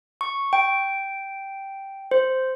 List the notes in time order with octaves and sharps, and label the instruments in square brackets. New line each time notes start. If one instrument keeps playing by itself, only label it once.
[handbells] C#6
G5
C5